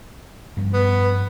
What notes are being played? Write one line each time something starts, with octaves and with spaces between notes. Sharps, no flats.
G2 F3
B3